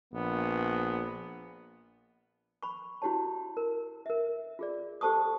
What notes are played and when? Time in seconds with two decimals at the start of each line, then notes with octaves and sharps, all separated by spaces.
0.14 A#1 B3
2.63 B5 C#6
3.02 E4 F#4 G4 C#5 A5
3.57 A#4
4.06 A#4 E5
4.59 F4 G#4 D5
5.01 G4 A4 C5 A5 C#6 D#6